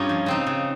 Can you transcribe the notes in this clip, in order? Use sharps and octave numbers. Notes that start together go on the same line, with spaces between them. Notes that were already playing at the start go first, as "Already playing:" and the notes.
Already playing: G2 C#4 D#4 F4 G4
F3
C#3 C4 D#4
C#3